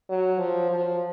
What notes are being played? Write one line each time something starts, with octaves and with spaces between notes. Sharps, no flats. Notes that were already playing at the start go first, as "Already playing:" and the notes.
F#3
F3
F3